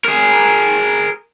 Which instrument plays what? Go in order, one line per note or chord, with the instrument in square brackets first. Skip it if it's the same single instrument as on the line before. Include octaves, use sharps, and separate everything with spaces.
[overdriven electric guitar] G#4 A#4